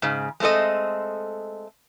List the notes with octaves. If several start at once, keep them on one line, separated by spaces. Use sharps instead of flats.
G#2 C#3
G#3 A3 C4 A4 D#5